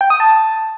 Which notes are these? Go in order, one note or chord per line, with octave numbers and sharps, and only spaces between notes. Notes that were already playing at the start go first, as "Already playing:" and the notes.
G5
D#6
A5